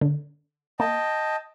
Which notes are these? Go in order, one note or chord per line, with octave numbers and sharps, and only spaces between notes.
D3
A#3 D#5 G5 A5